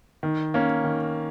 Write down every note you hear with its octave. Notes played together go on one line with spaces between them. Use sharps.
D#3
A#3 C#4
D#3